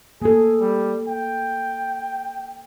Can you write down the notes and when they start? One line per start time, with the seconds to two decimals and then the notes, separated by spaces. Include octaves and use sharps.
0.22 A#3 G#4 A4
0.61 G3
1.08 G5